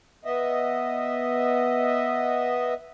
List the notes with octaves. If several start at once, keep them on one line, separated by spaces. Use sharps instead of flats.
B3 D#5 E5